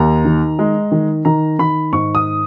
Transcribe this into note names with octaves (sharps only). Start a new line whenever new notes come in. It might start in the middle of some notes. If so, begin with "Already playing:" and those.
Already playing: D#2 A#5
D#3
G#3
D#3
D#3 A#5
D#3 B5
G#2 C#6
D#6